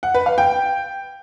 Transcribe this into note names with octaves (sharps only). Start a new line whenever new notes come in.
F#5
B4
F5
G5